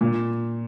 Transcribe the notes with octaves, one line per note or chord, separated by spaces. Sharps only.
A#2